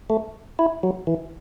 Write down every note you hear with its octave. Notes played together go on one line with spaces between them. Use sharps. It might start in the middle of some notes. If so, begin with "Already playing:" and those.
A3
E4
F#3
E3